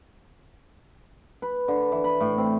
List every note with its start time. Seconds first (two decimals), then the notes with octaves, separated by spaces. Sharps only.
1.42 B4
1.68 D3
1.92 E3
2.04 B5
2.20 A2
2.38 C4